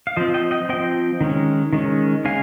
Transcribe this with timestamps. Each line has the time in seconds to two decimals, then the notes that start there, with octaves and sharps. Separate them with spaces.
0.07 F5
0.16 F3 C5 D#5
0.20 C4
0.34 D#5 G5
0.51 D#5 G5
0.69 F3 C4 D#5 G5
1.21 D#3 G#3 C#4
1.73 D#3 G#3 C#4
2.25 C#3 G#3 C#4 F5 G#5